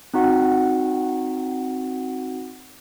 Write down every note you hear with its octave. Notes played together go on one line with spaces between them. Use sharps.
C4 D#4 F#4 F#5